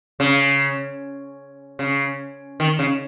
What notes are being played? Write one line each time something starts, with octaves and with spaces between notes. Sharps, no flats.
C#3
C#3
D#3
C#3